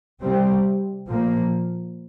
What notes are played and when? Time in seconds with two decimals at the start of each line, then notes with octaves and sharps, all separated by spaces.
0.21 C3 G3 C4
1.07 A#2 F3 A#3